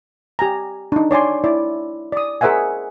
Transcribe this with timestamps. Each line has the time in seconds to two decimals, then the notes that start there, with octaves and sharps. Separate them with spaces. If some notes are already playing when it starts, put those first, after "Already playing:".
0.39 G4 G#5 A#5
0.92 D4 D#4
1.11 C#5 D5 G#5 C6
1.44 E4 D5
2.12 D5 D#6
2.41 G#4 A#4 C5 E5 F#5 G#5